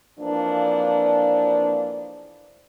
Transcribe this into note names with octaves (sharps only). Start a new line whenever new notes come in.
F2 E3 F3 A#3 D4